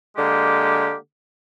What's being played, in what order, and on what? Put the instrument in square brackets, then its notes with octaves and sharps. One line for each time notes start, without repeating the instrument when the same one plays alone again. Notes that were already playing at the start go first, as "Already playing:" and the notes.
[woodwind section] D3 G#3 A#3 G4